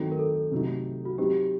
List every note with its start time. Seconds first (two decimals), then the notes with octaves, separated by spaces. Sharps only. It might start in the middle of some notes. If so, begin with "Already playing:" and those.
Already playing: D#3 F#3 A3 C4 D#4
0.11 A#4
0.19 A4
0.51 C3 F#3 A3 D#4
1.05 F#4
1.18 F#3 C4 D#4 G4